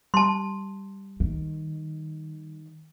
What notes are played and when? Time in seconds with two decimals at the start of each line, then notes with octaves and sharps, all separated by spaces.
0.14 G3 A5 C6
1.20 D#3